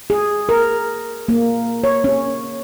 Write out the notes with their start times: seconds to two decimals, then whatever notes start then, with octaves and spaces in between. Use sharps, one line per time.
0.10 G#4
0.49 A#4
1.28 A#3
1.84 C#5
2.04 C#4